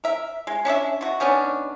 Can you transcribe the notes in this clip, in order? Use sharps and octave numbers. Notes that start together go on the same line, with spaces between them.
A#4 E5
G#3
C#4 D4 D5 E5
B2 F#4
D#3 B3 C#4 D4